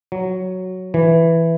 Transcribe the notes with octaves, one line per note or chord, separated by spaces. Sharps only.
F#3
E3